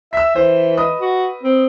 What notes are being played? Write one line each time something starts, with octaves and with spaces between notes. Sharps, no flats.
E5 E6 B6
E3 C5
B4 D#5 D#6
F#4
C4